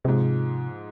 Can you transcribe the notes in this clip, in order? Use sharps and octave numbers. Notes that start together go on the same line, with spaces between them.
G#2 C3 F3 G#3